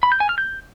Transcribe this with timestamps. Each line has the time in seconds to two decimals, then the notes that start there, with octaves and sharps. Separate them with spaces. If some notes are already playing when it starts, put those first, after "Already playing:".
0.03 B5
0.12 G6
0.20 G#5
0.29 F6
0.38 G6